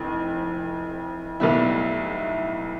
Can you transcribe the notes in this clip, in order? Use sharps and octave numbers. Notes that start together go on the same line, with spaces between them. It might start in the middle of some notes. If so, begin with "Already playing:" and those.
Already playing: F1 F2 E3
B1 A2 G3 B3 E4